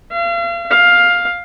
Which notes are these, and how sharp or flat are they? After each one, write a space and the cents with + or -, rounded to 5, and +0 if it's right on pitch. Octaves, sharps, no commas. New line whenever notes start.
F5 -40
F5 +10